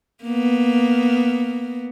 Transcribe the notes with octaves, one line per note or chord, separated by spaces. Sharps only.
A#3 B3